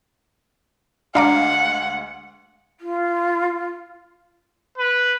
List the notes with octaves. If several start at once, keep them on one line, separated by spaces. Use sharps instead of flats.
D2 G#3 D4 F5 F#5 A#5 D6
F4
B4